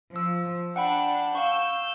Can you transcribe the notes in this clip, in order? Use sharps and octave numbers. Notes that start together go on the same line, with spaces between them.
F3 E6
D4 F#5 G5 B5
F5 C#6 E6 G6